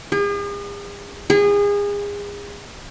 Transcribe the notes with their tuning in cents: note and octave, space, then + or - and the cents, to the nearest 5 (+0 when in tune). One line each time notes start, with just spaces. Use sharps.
G#4 -45
G#4 -30